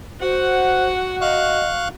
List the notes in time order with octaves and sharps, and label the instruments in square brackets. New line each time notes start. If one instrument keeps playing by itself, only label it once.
[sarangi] F#4 [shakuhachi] C5 [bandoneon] F#5
[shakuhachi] D#5 [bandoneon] F5 C#6 F#6